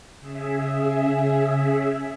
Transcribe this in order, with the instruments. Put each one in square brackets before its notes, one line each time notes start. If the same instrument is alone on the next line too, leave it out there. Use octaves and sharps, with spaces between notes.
[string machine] C#3 G#4 E5